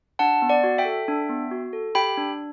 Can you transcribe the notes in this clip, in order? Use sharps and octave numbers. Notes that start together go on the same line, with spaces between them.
D4 F#5 A5
B3
D5 F#5
F#4
E5 G5
A4
D4
B3
F#4
A4
G4 G5 B5
D4